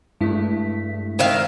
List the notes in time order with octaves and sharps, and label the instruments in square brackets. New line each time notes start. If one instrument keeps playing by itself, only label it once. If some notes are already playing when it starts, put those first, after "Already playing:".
[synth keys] G2 A3 [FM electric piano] G#3 E4 B6
[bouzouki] D#3 E5 F5 [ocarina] C5